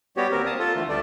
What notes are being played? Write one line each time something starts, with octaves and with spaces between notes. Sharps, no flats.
G3 B3 F#4 G4 C#5
D#2 C4 A#4
F5 A5 D#6
F4 A4
D3 E3 A3
D2 G3 A3 A4 D5